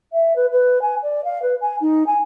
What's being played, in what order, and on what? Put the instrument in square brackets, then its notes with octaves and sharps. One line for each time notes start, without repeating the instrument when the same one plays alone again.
[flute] E5
B4
B4
G#5
D5
F5
B4
G#5
D#4
G#5